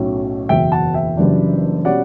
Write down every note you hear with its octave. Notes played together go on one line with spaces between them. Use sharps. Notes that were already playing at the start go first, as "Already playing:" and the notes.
Already playing: B1 A2 F#3 C#4
F#1 E2 B2 E5 G5
F#5 A5
E5 G5
F#1 F#2 E3 G3 D4
B2 G3 C#4 D5 F#5